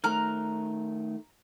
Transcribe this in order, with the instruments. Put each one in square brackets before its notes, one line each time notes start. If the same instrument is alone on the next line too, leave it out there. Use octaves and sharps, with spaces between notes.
[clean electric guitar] D#3 A3 [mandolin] A#5 F6 F#6